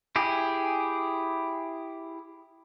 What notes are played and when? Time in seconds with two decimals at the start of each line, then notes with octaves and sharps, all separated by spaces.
0.16 E4 G4 G#4